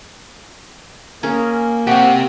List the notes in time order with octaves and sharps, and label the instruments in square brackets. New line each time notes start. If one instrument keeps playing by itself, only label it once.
[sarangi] A#3 [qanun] C#4 G#4 A#4
[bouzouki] F3 F#4 [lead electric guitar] C4 G4